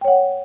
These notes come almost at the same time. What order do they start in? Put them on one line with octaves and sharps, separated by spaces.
G5 C#5 F#5